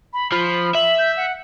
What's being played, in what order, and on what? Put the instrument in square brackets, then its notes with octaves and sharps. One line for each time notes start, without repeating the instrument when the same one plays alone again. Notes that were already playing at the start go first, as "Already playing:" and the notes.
[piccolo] B5
[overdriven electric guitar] F3 [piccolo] B5
[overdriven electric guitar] E5 [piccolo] F#7
[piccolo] G6
F#5